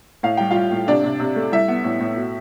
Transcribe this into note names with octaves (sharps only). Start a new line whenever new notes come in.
A2 F5
G3 G5
G3 F4 F5
A2
C3 D4 D5
C3
C3
A3
G3 E4 E5
B3
A2
A2
B2